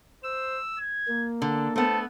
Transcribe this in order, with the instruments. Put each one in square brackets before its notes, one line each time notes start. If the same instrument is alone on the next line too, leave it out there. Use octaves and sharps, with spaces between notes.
[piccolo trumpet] C5 [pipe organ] E6
[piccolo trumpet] G#6
[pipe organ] A#3
[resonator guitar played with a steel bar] D3 [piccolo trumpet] A4
[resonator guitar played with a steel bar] A3 B3 [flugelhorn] A4 [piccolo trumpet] C5